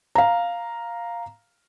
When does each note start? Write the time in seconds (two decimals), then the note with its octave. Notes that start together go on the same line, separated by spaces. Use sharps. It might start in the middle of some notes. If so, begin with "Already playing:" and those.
0.15 F5 A#5